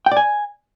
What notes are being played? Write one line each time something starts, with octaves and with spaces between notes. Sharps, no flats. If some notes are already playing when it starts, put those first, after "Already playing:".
G5
D5
G#5